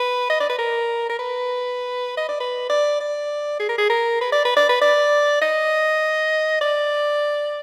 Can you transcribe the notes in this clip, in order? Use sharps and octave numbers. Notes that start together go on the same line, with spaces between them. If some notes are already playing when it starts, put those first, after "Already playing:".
Already playing: B4
D#5
D5
B4
A#4
A#4
B4
D#5
D5
B4
D5
D5
G#4
A#4
G#4
A#4
B4
D5
B4
D5
B4
D5
D#5
D5